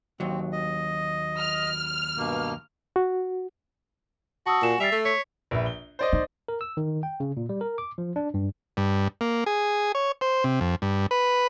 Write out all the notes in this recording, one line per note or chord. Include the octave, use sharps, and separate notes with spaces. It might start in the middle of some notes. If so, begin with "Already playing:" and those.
D#2 F#3 C4
D#5
F6
G2 B2 A#3
F#4
F#4 A5 D#6 E6
A#2 G#5 E7
G3 E5 A6 C7 F7
A3
C#5 B6
A#1 B4 E5
G7
C5 D5 D#5
D#4
A#4
E6
D#3
G5
C#3
A#2
G3
A#4
D6
F3
D4
G2
G2
A#3
G#4
C#5
C5
C3
F2
G2
B4